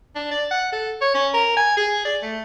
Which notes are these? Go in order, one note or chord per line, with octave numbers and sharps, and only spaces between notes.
D4
D5
F#5
A4
C#5
C#4
A#4
G#5
G#4
D5
A3